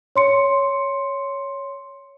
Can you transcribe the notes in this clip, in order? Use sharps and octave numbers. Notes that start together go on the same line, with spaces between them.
C#5 C6 C#7